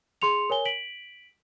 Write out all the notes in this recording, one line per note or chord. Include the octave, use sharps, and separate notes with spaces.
G#4 C6 C#7 F7
A#4 C#5 G#5 G7
B6 D7 F#7